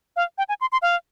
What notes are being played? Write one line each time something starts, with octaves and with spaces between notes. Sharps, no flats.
F5
G5
G#5
C6
C6
F5